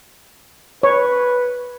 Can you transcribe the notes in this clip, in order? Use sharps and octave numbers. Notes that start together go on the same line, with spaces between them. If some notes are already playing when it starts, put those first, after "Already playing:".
B4 C#5